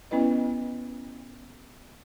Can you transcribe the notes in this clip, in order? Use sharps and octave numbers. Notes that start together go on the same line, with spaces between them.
B3 C#4 E4 B4 D#5